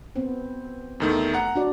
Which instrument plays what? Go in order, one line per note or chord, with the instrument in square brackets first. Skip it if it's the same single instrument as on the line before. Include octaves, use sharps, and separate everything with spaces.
[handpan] B3 C4
[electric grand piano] E2 D#3 A3
F#5 A#5
[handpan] D4 F#4 D5